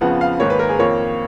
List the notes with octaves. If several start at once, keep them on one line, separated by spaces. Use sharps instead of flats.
F2 C#3 F3 B3 F#5
F5
G#2 D#3 A#3 C#5
B4
A#4
G#4
F2 D#3 A#3 C#5